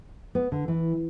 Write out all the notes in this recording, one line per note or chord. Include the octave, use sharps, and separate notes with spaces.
B3
D3
E3